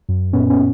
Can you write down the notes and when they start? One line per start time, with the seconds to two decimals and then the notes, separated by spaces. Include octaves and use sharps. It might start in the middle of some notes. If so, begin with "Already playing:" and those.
0.09 F#2
0.33 A#2 B3 C#4
0.50 B3 C#4